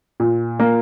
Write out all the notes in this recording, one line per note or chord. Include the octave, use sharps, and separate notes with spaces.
A#2
A#3